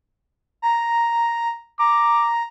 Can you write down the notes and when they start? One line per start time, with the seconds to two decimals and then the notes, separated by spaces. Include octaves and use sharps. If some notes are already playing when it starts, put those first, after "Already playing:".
0.62 A#5
1.79 A#5 D6